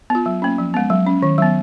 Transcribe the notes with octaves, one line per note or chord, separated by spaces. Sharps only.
B3 F4
F#3
A#3 C#4
F3
G#3 B3
F#3
C#4
D#3
F#3 B3